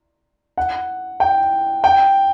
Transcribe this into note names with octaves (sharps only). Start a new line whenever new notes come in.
F#5
G5
G5